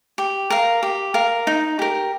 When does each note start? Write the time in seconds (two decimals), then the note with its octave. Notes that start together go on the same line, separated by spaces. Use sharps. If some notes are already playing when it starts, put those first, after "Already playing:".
0.18 G4
0.50 A#4 F5
0.83 G4
1.14 A#4 F5
1.47 D#4
1.79 G4 A#4